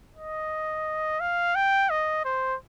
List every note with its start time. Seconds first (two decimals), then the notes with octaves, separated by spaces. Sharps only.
0.16 D#5
1.20 F5
1.55 G5
1.90 D#5
2.25 C5